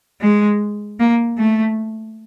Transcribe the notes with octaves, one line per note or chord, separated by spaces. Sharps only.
G#3
A#3
A3